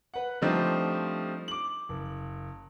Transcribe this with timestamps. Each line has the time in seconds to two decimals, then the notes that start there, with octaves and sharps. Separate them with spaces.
0.14 B4 F#5
0.41 F3 G3 A3 C4 D4 D#4
1.48 D6 F#7
1.89 F#1